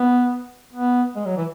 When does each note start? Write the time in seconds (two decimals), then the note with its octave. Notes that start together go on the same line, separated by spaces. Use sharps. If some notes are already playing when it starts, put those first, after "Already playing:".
Already playing: B3
0.73 B3
1.16 G#3
1.26 F#3
1.37 E3